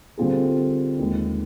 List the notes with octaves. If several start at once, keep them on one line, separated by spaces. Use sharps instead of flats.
D3 G3 C4 F4 G#4
D#2 D#3 G#3